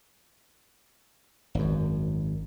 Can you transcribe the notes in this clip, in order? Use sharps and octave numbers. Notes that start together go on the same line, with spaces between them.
G#1 F#2